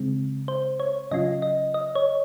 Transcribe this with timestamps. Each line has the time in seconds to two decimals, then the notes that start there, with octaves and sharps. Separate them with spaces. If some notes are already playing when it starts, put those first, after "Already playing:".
Already playing: C#3 G#3 C4
0.48 C5
0.80 C#5
1.11 C#3 F#3 C#4 F4 D#5
1.42 D#5
1.74 D#5
1.95 C#5